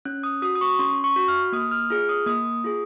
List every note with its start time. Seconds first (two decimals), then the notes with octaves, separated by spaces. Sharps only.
0.05 C#4 F#6
0.23 D#6
0.42 F#4 D#6
0.55 D#6
0.61 C#6
0.79 C#4 C6
1.04 C#6
1.16 F#4
1.28 F6
1.52 A#3 D#6
1.71 F6
1.90 F4 G#4 F6
2.09 D#6
2.26 A#3 D#6
2.64 F4 G#4